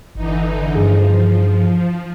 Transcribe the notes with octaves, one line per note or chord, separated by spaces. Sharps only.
G1 D3 E3 D#4
G2 F3 G#4